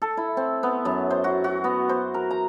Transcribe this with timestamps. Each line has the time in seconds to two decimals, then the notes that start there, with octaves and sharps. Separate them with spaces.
0.02 A4
0.17 E4
0.37 C4
0.63 B3
0.85 F#2
1.10 C5
1.24 F#4
1.44 F#4
1.64 B3
1.89 C5
2.14 A#4
2.31 A#5